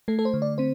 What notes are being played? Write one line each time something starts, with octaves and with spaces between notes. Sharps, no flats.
A3 A4
A4
C5
D3
D5
C4 C5